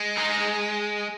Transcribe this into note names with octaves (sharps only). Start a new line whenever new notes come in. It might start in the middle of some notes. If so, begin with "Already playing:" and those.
Already playing: G#3
D#4 G#4